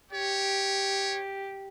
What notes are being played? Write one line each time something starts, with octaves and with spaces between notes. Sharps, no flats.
G4 C#5